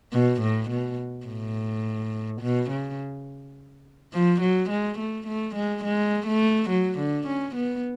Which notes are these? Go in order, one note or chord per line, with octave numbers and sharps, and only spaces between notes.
B2
A2
B2
A2
B2
C#3
F3
F#3
G#3
A3
A3
G#3
G#3
A3
F#3
D3
C#4
B3